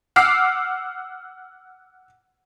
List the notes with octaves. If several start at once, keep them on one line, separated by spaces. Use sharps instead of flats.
F#5 D6 E6 F6 C7